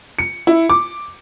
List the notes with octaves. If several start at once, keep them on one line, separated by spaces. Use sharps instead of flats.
C#7
E4
D6